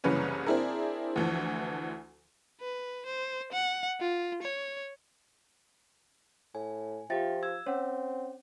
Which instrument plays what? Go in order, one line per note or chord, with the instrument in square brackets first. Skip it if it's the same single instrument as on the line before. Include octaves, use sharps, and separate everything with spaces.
[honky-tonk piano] F#1 C2 C#3 E3 C#4 B4
C4 D4 E4 G#4 A#4
D2 E3 F3
[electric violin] B4
C5
F#5
F4
C#5
[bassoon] A2 [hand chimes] G#5
[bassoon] F3 [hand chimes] F4 G4 F5 [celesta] E5 G5 A6
[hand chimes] E6 [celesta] G#6
[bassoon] C4 [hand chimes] C#4 [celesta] C#5 F#5